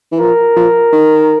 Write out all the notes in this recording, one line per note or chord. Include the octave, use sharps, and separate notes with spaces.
E3
F3 A#4
F3
D#3